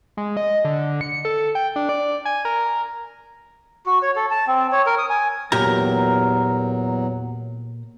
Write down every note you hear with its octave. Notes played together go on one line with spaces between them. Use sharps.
G#3
D#5
D3
C#7
A4
G5
D4
D5
G#5
A#4
F#4
C#5
A4
A5
C4
C#5
A#4
D#6
G#5
E2 A#2 F#3 G4 A#4 A#5